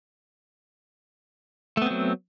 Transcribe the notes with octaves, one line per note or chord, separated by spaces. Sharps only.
F#3 A3 B3 C4